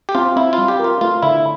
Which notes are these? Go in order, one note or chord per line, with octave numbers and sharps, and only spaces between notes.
G4
C4 F4
C4 E4
F4
G3
G4
F4 A#4
A3 F4
D3 E4